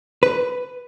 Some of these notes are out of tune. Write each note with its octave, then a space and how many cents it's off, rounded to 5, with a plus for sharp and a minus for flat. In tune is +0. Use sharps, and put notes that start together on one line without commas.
B4 +10